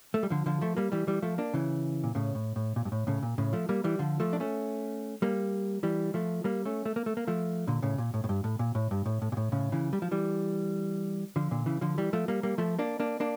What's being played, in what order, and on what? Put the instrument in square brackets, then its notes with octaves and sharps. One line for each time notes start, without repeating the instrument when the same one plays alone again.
[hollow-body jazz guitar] A3
G3
D3 F3
D3 F3
F3 A3
G3 A#3
E3 G3
E3 G3
F3 A3
A#3 D4
C#3 E3
A#2
A2 C#3
A2
A2
A#2
G2
A2
A2 C#3
A#2
A2 C#3
F3 A3
G3 A#3
E3 G3
D3 F3
F3 A3
D4
A3 C#4
G3 A#3
E3 G3
F3 A3
G3 A#3
A3 C#4
A3
A#3
A3
A#3
F3 A3
A#2 D3
A2 C#3
A#2
A2
A2
G2
A2
A#2
A2
G2
A2
A2
A#2
A2
A2 C#3
C#3 E3
G3
F3
E3 G3
D3 F3
A#2 D3
C#3 E3
D3 F3
E3 G3
F3 A3
G3 A#3
G3 A#3
F3 A3
A#3 D4
A#3 D4
A#3 D4